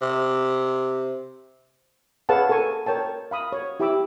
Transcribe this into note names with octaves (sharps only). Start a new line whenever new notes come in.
C3
G#4 B4 C#5 F5 F#5 A5
A4 A#4 G#5 C#6
A#4 C#5 G5 A5
F5 B5 D#6
C#5
E4 G4 E5 B5 D6 E6